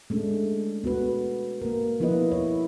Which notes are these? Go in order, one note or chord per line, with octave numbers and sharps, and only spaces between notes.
G#3 A3 C#4 D4
B3 F#4 B4
A#3 A#4
F3 B3 E4 F4 B4 D#5
E4 C#5